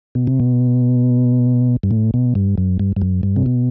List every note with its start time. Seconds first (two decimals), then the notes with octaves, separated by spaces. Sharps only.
0.15 B2
0.27 C3
0.40 B2
1.83 G2
1.91 A2
2.14 B2
2.35 G2
2.58 F#2
2.79 G2
2.96 G2
3.02 F#2
3.23 G2
3.36 C3
3.46 B2